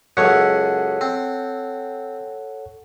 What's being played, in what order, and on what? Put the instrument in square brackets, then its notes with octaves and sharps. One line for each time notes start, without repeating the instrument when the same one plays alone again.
[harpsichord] C#2 F#2 [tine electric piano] A4 C#5 F#5
[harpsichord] C4